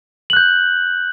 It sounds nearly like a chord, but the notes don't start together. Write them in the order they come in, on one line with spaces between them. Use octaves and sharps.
F#7 F#6 G6